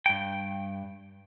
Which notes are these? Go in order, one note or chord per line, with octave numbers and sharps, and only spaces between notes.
G2 G5